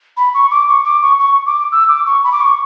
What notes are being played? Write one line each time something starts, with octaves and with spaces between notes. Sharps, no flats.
B5
C#6
D6
C#6
D6
C#6
C#6
D6
E6
D6
C#6
B5
D6
C#6